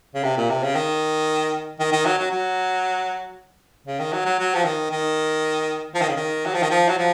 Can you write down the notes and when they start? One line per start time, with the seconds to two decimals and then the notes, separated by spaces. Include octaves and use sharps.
0.15 C#3
0.24 C3
0.37 A#2
0.50 C3
0.63 C#3
0.75 D#3
1.80 D#3
1.92 D#3
2.05 F#3
2.18 F#3
2.31 F#3
3.87 C#3
4.00 D#3
4.13 F#3
4.26 F#3
4.39 F#3
4.55 F3
4.65 D#3
4.91 D#3
5.95 F3
6.01 D#3
6.09 C#3
6.16 D#3
6.46 F#3
6.54 F3
6.63 D#3
6.71 F3
6.88 F#3
6.98 F3